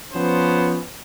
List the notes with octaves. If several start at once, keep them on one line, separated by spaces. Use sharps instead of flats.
F3 B3 C#4 C5